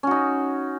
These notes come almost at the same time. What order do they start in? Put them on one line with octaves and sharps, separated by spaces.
C#4 F#4 D#4